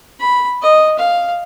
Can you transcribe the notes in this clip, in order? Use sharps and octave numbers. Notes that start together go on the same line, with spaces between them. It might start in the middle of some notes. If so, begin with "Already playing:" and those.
B5
D#5
F5